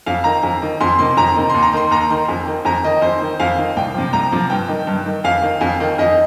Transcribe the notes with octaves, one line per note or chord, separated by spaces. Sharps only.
F2 F5
D#3 A#5
F2
D#3
F2 C6
C3 D#3 C6
F2 A#5
C3 D#3
D#2 C6
A#5
D#3 C6
D#2 A#5
D#3 C6
F2
D#3
F2 A#5
D#3 D#5
F2 C5
D#3
F2 F5
D#3
C2 G5
C3 F3
C2 A#5
C3 F3
G2 G5
D#3
G2
D#3
F2 F5
D#3
F2
D#3
F2 D#5